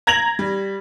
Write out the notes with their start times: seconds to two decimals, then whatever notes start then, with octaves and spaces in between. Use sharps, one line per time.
0.07 A#5 G#6 A#6 F7 F#7
0.39 G3